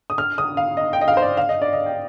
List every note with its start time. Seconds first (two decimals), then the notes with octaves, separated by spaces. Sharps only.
0.10 D#6
0.18 F6
0.38 D#6
0.57 F5
0.77 D#5
0.93 G5
1.01 D#5
1.08 F5
1.17 C5
1.22 D5
1.37 F5
1.49 D#5
1.62 D5
1.73 D#5
1.86 G5